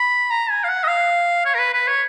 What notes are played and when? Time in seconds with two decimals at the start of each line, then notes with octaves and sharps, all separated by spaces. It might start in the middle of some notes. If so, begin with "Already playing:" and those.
Already playing: B5
0.30 A#5
0.50 G#5
0.64 F5
0.69 F#5
0.83 D#5
0.87 F5
1.45 C#5
1.54 A#4
1.59 B4
1.73 B4
1.88 C#5